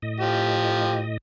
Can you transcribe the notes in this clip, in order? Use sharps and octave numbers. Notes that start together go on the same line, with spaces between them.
A2 D#5
F3 G4